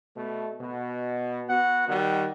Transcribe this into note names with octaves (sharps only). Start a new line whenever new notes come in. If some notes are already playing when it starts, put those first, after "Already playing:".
B2 A3
B2
B3 F#4 F#5
D#3 G3 F#5